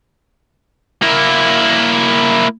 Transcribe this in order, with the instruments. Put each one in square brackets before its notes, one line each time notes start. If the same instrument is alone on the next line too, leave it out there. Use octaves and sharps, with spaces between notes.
[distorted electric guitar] A#3 E4